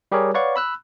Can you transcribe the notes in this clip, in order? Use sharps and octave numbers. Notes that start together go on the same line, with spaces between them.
G3 G4 G#4 A#4 C#5
B4 C#5 D5 F5 F#5 C#6
B5 E6 F#6